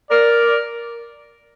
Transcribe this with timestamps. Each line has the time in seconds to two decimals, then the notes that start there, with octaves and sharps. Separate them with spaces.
0.10 A#4 D5